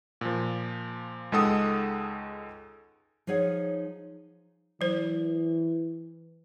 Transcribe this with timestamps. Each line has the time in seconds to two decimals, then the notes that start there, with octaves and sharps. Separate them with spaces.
0.21 A#2 F3
1.32 C#2 G#3 D#4 A4 F#5 D#6
3.27 F3 D#4 G#4 C#5 F#5
4.81 E3 F#3 C5